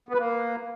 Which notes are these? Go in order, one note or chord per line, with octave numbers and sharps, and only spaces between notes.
B3
B4
A#3